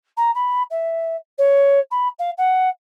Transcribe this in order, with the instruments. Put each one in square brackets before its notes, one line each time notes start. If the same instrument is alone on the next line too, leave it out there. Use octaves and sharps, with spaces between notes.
[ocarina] A#5
B5
E5
C#5
B5
F5
F#5